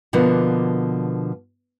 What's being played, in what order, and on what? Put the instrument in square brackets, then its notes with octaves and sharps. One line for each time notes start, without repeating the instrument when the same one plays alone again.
[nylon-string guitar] B2 D3 F3 A#3 B3